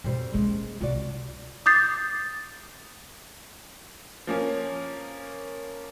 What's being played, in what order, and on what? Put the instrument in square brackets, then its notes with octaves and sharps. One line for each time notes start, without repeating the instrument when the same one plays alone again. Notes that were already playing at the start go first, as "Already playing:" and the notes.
[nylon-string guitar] F2 G3 C5 [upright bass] B2
[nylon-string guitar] G#3 [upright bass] A#3 C#4
[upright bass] C2 C3 [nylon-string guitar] F4 F#4 D5
[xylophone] D6 D#6 G6 A6 C7
[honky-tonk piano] F3 A#3 C#4